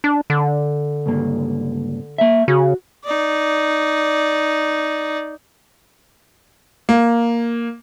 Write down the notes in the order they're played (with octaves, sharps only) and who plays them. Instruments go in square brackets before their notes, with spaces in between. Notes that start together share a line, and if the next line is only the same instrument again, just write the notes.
[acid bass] D4
D3
[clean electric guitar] C#2 G2 A#3
A#3 E5
[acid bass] C#3 [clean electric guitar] F#4
[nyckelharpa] D#4 D5
[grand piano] A#3